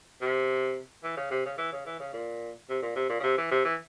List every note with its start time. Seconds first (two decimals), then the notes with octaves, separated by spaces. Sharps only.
0.21 C3
1.04 E3
1.17 C#3
1.31 C3
1.45 C#3
1.58 E3
1.73 C#3
1.86 E3
1.99 C#3
2.13 A#2
2.69 C3
2.82 A#2
2.96 C3
3.09 A#2
3.20 C#3
3.23 C3
3.38 E3
3.51 C3
3.65 E3